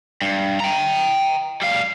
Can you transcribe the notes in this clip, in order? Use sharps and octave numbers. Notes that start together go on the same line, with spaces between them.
G2
G5 A#5
G3 F5